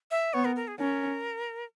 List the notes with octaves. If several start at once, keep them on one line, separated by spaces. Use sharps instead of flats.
E5
B3 C#5
A#4
A#4
G#4
C#4 A#4